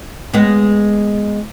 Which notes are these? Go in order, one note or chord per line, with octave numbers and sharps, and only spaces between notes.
G#3 B3